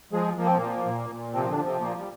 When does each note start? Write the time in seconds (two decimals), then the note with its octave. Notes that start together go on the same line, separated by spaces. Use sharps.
0.12 F3 G#3 G#4
0.37 F3 A#3
0.46 C4
0.57 A#2 F3 A#3
0.86 A#2
1.10 A#2
1.33 C3 F3 C4
1.45 C4
1.49 D3 D4
1.58 F3
1.66 C3 C4
1.81 A#2 A#3
1.98 G3